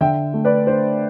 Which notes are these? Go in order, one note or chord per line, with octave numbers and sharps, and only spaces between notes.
D3 E5 G5
A3
B4 D5
D4 C5